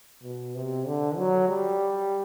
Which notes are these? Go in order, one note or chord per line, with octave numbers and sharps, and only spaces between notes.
B2
C3
D3
F#3
G3